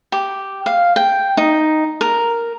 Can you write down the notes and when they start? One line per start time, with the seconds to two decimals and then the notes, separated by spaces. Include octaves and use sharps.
0.12 G4
0.66 F5
0.96 G5
1.37 D#4
2.01 A#4